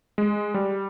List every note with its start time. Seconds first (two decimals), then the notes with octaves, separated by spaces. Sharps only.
0.18 G#3
0.54 G3